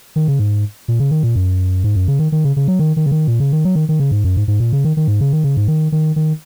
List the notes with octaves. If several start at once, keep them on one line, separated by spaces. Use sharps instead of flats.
D#3
C#3
G#2
A#2
C#3
D#3
A#2
F#2
G#2
F#2
C#3
D#3
D#3
C#3
C#3
F#3
D#3
D#3
C#3
D#3
A#2
C#3
D#3
F#3
D#3
D#3
C#3
G#2
F#2
G#2
G#2
A#2
C#3
D#3
D#3
G#2
C#3
D#3
C#3
G#2
D#3
D#3
D#3